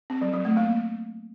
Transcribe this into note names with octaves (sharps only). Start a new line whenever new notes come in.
C4
F#3
F#3
A3
A#3